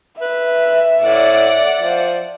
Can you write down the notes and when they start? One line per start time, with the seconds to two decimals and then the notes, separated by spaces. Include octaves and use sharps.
0.21 B4 E5
1.01 A2 D5 F#5
1.81 F3